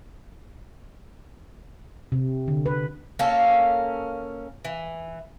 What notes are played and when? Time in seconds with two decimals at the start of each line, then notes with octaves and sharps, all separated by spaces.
2.12 C3
2.48 D3
2.66 B4
3.19 A#3 C#4 A4
4.65 E3